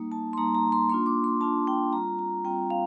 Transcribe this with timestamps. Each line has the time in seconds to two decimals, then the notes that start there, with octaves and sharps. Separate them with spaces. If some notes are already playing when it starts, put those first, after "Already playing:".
Already playing: G3 A#3 D#4
0.12 A5
0.33 C6
0.37 G3 A#3 D#4 A#5
0.55 A#5
0.72 C6
0.89 A#3 D4 F4 C6
1.06 D6
1.24 C6
1.41 A#3 D4 F4 A5
1.67 G5
1.93 G3 C4 F4 A#5
2.19 A#5
2.45 G3 C4 F4 G5
2.70 F5